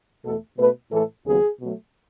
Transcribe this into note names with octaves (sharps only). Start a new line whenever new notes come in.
E2 B2 A3 A4
B2 A3 B4
A2 E3 A3 A4
D#2 C#3 F#3 B3 G#4
B2 F#3 A3